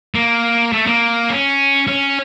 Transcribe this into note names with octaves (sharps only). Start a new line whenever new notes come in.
A#3
A3
A#3
C#4
C#4